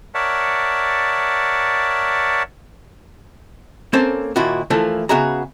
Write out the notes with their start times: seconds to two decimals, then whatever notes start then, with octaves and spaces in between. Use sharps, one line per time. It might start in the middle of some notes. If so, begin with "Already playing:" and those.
0.15 A#4 C#5 D5 E5 F#5 A5
3.93 A#3 C4 C#4 A4 C5
4.36 D#2 A#2 E4 F#4
4.70 E3 F3 A3 A#3 E4
5.09 C#3 B3 F#4 G#4 E5 A#5